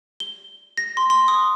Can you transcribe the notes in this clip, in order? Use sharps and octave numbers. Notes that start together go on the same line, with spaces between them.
G7
A#6
C6
C6
D#6